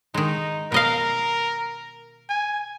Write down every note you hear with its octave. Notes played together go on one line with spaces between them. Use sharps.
D#3 G#3 D#4
B2 A#4 D#5 F5
G#5